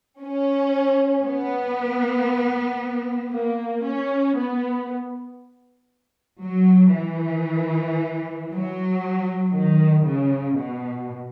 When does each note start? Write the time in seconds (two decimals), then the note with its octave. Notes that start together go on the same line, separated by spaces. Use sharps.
0.21 C#4
1.24 B3
3.32 A#3
3.84 C#4
4.36 B3
6.43 F#3
6.96 E3
8.51 F#3
9.54 D#3
10.06 C#3
10.58 B2